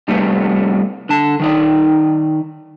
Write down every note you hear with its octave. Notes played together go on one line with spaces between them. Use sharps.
C3 G3 A3 B3 C4
D3 A5
D#3 D#4 D5